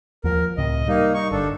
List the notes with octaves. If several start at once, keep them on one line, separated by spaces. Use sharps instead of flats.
D#2 F3 A#4
C#2 A2 C3 D#5
G3 A#3 D#4
D#4 C#6
G1 D4 A4